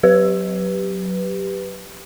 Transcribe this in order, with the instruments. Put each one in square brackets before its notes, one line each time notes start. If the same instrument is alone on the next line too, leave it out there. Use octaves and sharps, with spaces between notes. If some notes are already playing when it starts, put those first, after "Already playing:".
[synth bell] F#3 G4 B4